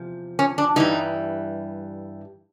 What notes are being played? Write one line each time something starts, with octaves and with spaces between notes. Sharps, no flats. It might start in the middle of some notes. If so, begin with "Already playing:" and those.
Already playing: E2 C3 F3
C#4
D4
G2 E3 G3 D#4